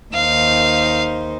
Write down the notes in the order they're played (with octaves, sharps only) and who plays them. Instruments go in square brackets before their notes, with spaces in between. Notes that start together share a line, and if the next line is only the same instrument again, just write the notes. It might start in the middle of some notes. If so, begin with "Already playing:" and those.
[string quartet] D#2 D#4 C5 [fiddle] F5